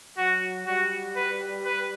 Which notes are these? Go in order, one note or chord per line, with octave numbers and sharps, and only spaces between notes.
F#3 F#4
G3 F#4
B4
B4